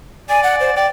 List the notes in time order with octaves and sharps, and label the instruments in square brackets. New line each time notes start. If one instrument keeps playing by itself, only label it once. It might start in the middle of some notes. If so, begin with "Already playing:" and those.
[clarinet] D5 [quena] G#5
[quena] F#5
C5
[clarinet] D5 [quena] G5